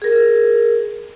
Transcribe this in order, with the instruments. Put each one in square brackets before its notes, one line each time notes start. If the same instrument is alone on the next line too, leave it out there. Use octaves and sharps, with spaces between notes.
[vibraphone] G#4 A#4